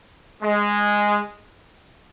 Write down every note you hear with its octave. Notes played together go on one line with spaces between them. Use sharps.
G#3